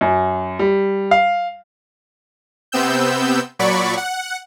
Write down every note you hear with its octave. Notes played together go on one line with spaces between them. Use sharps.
F#2
G3
F5
C3 B3 C4 E6 G6
A#2 F#3 D5 B5 C#6
F#5